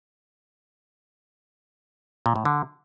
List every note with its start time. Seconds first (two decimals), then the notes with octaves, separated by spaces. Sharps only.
2.26 A#2
2.36 A2
2.45 D3